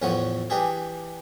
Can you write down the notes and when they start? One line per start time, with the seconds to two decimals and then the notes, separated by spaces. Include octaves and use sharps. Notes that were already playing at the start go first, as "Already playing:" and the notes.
0.02 E2 A2 F3 B3 C#5
0.50 E3 D4 G4 G#4